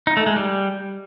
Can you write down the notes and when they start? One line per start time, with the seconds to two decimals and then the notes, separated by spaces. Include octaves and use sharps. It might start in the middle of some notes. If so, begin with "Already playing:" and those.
0.07 D#4
0.17 A3
0.26 G#3
0.36 G3